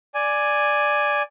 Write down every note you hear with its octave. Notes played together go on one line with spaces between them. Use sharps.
D5 G#5